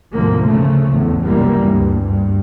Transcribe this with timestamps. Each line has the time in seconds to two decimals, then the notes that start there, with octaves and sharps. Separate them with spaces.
0.11 D2 G#2 B2 F3 A#3
0.46 C#3 F3 A3
0.89 A1 E2 A2
1.25 F1 C#2 F#2 E3 G3 A#3
1.60 D2 G2
2.03 G2